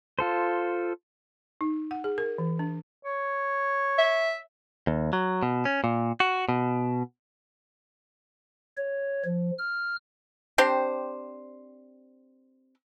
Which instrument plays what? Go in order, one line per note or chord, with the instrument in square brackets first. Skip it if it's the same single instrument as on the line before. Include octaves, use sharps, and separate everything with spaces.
[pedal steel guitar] F4 A4 C5
[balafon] D#4
F#5
G#4
A#4
E3
D4
[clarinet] C#5
[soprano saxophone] E5
[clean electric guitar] D#2
F#3
B2
C#4
A#2
F#4
B2
[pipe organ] C#5
F3
F6
[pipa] C4 D4 G4 C5